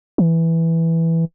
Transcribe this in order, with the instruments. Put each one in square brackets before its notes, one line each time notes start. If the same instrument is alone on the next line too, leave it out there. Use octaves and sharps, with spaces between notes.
[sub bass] E3